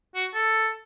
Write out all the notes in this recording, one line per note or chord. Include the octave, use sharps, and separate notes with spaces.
F#4
A4